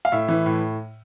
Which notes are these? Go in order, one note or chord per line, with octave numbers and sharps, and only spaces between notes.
F5
A2 E5
E3
A2